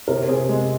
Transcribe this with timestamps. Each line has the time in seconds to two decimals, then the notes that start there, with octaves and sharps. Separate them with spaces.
0.08 C3 A#4
0.28 C3 G#4
0.49 G#3